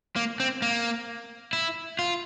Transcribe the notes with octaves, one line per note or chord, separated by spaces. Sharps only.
A#3
C4
A#3
E4
F4